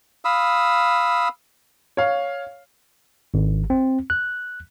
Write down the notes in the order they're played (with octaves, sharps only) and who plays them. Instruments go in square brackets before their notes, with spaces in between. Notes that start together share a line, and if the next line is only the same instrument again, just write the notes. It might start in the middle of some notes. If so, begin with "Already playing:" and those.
[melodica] F5 B5 D#6 E6
[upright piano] C#5 F5
[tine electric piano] G#1
C4
F#6